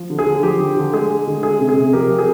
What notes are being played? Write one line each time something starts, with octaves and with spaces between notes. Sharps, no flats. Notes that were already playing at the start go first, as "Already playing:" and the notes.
Already playing: F3
D3
G#4
D3
F3 G4
D3
D3
G#3 G#4
G#3
D3
G#3 G#4
C3
G#4
C3
F3 G4 A#4
F3
G#4